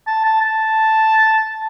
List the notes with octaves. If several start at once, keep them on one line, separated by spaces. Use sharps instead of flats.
A5
A5
A5